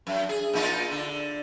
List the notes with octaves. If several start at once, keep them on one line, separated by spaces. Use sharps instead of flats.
F#2
G#4
A#2 D#4 F4
D3